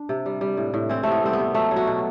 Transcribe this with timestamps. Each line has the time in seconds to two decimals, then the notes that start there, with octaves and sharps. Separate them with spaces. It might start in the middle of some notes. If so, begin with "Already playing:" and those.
Already playing: D4
0.09 C3
0.26 G3
0.41 G3
0.57 A2
0.74 A2
0.89 E3 C4
1.03 C3 A3
1.12 B3
1.23 G3 C4
1.33 B3
1.39 C3
1.55 F#3 A3
1.71 F#3
1.76 F#4
1.87 B2